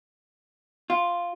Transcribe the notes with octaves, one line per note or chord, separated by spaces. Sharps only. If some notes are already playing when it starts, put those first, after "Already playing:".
F4